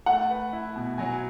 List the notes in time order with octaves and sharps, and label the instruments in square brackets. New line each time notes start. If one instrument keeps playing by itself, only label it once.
[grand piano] A3 [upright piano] F#5
[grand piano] B4
E4
B2
[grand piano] F#3 [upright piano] G#5